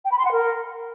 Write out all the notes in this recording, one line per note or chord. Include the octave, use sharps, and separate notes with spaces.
G5
B5
C6
F#5
A#4